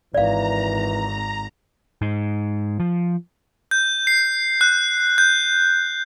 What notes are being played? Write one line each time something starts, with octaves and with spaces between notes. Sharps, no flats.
G#1 E3 D5 F5 A#5
G#2
F3
G6
C7
F#6
G6